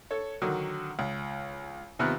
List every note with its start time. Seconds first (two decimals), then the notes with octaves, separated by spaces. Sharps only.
0.11 A4 C#5
0.42 D3 D#3 F#3
0.99 C#2
1.99 D#2 C3 B3 F4 F6 F#6